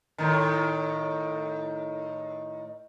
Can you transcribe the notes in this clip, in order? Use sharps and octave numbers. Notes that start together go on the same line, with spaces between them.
A2 D#3